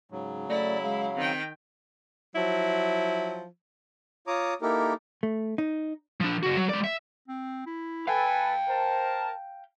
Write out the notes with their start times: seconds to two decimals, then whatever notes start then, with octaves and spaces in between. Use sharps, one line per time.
0.11 G#2 C#3 F#3
0.49 A3 E4 D5
0.83 G#3 F5
1.16 D#3 C4 G5
2.35 F3 F#3 E4
4.27 F4 C#5 A#5 D6 D#6
4.62 A#3 D#4 E4 G4 A4 A#4
5.23 A3
5.58 D#4
6.20 F3 D4
6.43 C#3 F#4
6.57 F#3
6.69 G#3 D5
6.84 E5
7.28 C4
7.66 E4
8.08 A4 B4 F5 G5 G#5
8.69 A#4 C5 A5